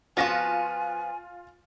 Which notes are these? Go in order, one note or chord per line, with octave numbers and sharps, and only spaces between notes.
F3 B3 F4 F#4 F5 G#5 A#6